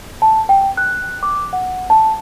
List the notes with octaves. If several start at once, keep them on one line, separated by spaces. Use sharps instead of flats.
A5
G5
F#6
D6
F#5
A5